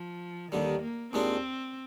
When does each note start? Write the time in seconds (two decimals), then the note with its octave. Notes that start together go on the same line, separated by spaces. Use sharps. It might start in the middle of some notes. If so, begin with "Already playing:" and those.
Already playing: F3
0.52 D#2 D3 D#3 G3
0.82 A#3
1.13 D#2 D#3 G#3 C4 D4 F4